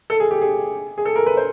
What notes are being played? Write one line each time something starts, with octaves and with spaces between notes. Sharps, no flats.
A4
G#4
G4
G#4
G#4
A4
A#4
B4
C5